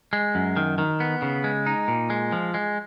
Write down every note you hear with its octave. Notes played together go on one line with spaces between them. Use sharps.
G#3
F#2
D#3
D#3
B3
C#3
G#3
D#4
A#2
G#3
F3
G#3